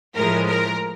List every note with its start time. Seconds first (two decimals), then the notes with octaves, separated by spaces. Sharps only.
0.15 A2 F3 G#3 A#4
0.47 A#4